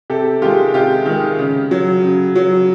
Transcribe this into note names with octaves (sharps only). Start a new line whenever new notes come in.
C3 G4 A4
D#3 G#3 F4 G4
C3 F4 G4
D#3 G#3
C#3
F#3
C#3
F#3